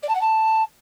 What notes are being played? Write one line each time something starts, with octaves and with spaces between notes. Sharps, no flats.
D5
A5
F#5
A5